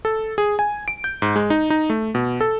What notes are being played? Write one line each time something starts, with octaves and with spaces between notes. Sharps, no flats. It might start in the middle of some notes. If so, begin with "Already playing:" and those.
A4
G#4
G#5
D7
G6
G#2
G#3
D#4
D#4
A3
B2
A4